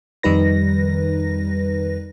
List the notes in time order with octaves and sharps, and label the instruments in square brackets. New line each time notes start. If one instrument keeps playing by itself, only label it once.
[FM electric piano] F2 D#3 G3 D#4 B4 A#6